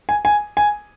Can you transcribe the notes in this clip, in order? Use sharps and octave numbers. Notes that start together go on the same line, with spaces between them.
G#5
G#5
G#5